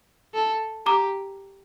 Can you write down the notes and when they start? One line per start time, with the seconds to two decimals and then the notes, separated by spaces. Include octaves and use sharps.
0.34 A4
0.86 G4 A#5 D6